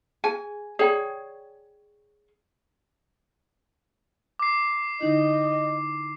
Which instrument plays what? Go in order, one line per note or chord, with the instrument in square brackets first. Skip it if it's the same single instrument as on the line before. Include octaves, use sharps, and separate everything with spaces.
[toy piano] G#4 [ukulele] G#5
[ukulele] G#4 C#5 [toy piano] D5 G5 A#5
[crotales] D6 C7
[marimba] D3 D#4 E4 [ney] D#5